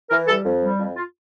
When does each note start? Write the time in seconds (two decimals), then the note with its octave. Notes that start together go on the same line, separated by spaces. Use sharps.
0.10 E3 A#4
0.28 G3 A4
0.45 F2
0.62 G3
0.79 F2
0.96 F4